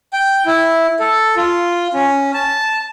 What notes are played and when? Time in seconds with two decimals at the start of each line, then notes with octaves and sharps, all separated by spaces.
0.13 G5
0.46 E4
0.99 A4
1.36 F4
1.94 C#4
2.34 A5